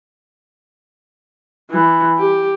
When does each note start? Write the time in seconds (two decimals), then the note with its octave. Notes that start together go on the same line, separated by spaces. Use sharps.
1.71 E3
2.18 G4